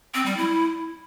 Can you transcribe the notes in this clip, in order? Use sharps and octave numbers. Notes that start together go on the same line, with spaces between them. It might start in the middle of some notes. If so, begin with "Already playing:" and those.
C4
G3
E4